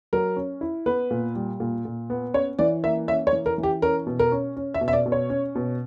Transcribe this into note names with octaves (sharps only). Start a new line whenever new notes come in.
F#3 A#4
C#4
E4
B3 B4
A#2
G3
A#2
A#2
B3
C#4 C#5
E3 D5
A#3 E5
C#4 E5
C#5
E3
A#4
E3
G4
C#4 A#4
B2
A#4
C#4
C#4
E5
B2
E5
D5
B2
C#5
C#4
B2